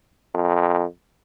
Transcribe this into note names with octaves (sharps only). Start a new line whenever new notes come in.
F2